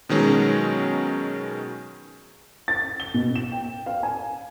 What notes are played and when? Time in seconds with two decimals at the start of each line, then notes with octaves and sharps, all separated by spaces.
0.09 B2 D#3 F#3 G#3 C#4
2.68 A6
3.00 G7
3.14 B2
3.36 E7
3.52 G5
3.86 F5
4.03 G#5